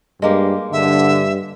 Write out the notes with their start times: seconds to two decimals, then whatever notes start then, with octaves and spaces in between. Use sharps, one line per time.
0.22 G2 G#3 A#3 G4
0.72 G2 D3 E5